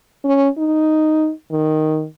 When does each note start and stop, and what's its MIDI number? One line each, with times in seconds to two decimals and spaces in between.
0.25 0.48 61
0.58 1.31 63
1.52 2.05 51